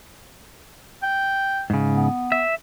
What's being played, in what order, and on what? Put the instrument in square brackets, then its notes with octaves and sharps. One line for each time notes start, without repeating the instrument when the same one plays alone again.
[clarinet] G5
[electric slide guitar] G#2 C#3
[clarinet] B3
[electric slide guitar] E5